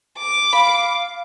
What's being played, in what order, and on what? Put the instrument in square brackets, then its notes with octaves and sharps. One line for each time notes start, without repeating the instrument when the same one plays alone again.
[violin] D6
[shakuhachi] F5 [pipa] B5